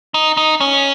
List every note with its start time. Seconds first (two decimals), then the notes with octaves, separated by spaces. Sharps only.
0.14 D#4
0.37 D#4
0.61 C#4